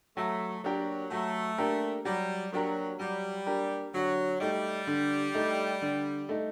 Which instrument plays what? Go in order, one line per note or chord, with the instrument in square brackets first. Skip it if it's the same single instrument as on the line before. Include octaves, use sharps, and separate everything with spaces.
[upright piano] F#3 [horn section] A3
[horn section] F#3 [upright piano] A#3 D4 G4 A#4
[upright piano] F#3 [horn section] A3
[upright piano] A#3 D4 G4 A#4
[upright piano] F#3 [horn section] G3
[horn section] F#3 [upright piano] A#3 D4 G4 A#4
[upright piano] F#3 [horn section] G3
[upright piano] A#3 D4 G4 A#4
[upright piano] D3 [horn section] F#3
[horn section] G3 [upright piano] A3 D#4
[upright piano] D3
A3 D#4
D3
A3 D#4